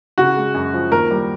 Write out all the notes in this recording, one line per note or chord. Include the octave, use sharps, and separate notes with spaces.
C#3 F#4
G#3
F#2
F3
D#2 A#4
G3